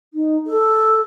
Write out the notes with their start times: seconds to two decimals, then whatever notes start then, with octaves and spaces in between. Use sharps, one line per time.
0.14 D#4
0.47 A4